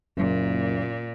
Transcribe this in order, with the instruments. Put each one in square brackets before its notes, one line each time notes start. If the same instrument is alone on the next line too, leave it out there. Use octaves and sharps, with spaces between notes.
[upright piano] F#1 [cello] A#2